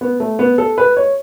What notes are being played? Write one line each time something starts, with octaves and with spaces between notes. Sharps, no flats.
B3
A3
B3
A4
B4
C#5